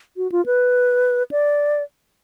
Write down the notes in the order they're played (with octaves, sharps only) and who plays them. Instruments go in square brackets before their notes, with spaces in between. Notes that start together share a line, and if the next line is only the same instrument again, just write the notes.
[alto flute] F#4
F4
B4
D5